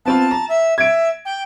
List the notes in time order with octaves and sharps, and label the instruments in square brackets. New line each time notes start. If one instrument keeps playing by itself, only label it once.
[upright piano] B3 C4 F4 [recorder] A5
[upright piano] A#5
[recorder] E5
[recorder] E5 [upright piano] G#6 D7
[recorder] G5